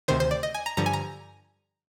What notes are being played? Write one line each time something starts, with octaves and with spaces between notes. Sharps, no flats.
D2 C3 D#3 C5
C5
D5
D#5
G#5
A#5
G2 D3 F3 A#5
G#5
A#5